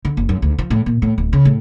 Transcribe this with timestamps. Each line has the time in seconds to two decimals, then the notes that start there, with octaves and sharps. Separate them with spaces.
0.05 D3
0.17 F#1
0.29 F#2
0.42 D2
0.59 F3
0.70 A2
0.86 A#2
1.02 A2
1.18 D1
1.33 C#3
1.45 A2